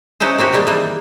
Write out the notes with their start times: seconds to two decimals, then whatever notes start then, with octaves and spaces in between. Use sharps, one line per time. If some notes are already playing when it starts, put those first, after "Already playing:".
0.20 C#4 D#4 E4 B4 C5
0.38 A#3 C4 F#4 G4
0.53 D#3 G3 G#3 A#3 G4
0.67 E3 G3 A#3